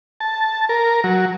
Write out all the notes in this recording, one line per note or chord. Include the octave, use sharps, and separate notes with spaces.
A5
A#4
F#3